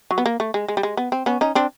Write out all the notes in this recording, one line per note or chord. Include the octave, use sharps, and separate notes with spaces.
F#3
B3
A#3
A3
G#3
G#3
G3
G#3
B3
C4
B3 C#4
C#4 D#4
C4 D4